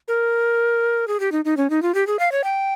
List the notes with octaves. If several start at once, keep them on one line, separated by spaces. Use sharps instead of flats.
A#4
G#4
G4
D#4
D#4
C#4
D#4
F4
G4
G#4
F5
C#5
G5